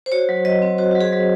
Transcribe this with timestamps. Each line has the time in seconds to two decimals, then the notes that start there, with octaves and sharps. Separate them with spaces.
0.06 C5
0.12 F#4 C#5
0.29 F#3
0.45 F#3 D#5
0.62 C4
0.78 F#4 C5
0.91 F#3 F#4
1.01 G#4
1.12 F#3